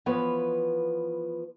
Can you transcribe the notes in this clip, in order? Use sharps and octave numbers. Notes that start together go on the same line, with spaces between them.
E3 F3 B3 B4 C#5